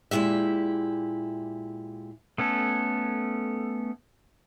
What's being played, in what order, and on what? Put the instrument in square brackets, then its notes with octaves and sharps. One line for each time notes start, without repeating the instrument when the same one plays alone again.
[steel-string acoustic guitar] A#2 G#3 E4 G4 E5
[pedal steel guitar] A3 B3 C#4 A4